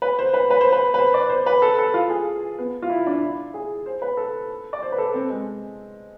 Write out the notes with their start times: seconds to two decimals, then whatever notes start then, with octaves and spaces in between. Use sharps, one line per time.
0.02 B4
0.19 C5
0.34 B4
0.50 B4
0.61 C5
0.72 B4
0.94 B4
0.98 C5
1.14 D5
1.29 C5
1.46 B4
1.62 A4
1.79 A4
1.94 F4
2.10 G#4
2.59 B3
2.82 F4
2.90 E4
3.07 D4
3.22 E4
3.54 G#4
3.86 C5
4.02 B4
4.17 A4
4.73 D5
4.82 C5
4.92 B4
4.98 A4
5.14 C4
5.30 G#3